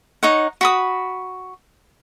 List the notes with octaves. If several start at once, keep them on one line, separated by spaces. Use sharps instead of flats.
D#4 C#5 F#5
F#4 B5 D#6